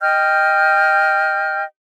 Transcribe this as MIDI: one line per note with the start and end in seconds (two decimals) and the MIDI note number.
0.01 1.64 75
0.01 1.64 79
0.01 1.64 89
0.01 1.64 91